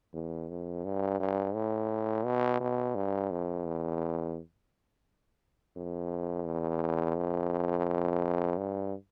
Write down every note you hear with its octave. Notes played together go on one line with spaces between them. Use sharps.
E2
F2
G2
G2
A2
B2
B2
G2
F2
E2
F2
E2
F2
G2